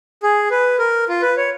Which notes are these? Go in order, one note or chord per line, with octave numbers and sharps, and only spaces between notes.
G#4
B4
A#4
F4
B4
C#5